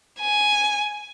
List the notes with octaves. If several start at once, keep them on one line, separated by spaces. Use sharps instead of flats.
G#5